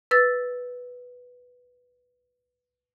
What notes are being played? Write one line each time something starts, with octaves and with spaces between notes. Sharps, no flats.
B4 E6 A6